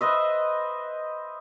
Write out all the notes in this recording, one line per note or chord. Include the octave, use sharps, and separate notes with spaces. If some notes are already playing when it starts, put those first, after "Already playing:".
B4 C5 D#5 E5